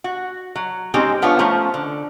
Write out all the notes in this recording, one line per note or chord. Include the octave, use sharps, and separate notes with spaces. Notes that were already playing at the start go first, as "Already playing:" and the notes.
F#4
F#3
G#3 C4 C#4 D#4 G4 G#4
F3 B3 D4 F4 C#5
F3 A3 C#4 C5 A#5
D3